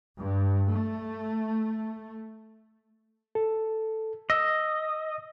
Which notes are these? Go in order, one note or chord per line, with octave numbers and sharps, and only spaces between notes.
G2
A3
A4
D#5 E6